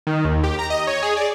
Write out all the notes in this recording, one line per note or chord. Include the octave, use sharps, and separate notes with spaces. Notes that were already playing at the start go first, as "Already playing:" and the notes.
D#3
D#2
G4
A#5
D#5
C#5
G#4
D5